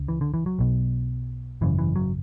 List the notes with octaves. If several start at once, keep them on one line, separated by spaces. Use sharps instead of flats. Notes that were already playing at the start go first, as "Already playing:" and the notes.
Already playing: C#2 C#3
E3
D3
E3
F#3
B1 B2
G#1 F#2 C#3 E3
E3
F#3